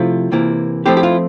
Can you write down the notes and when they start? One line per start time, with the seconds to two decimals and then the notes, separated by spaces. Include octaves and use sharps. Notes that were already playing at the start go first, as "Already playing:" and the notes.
Already playing: C3 F3 A3 E4 F4
0.32 C3 E3 A#3 E4
0.86 F3 A3 C4 E4 G4
0.97 G4
1.03 F4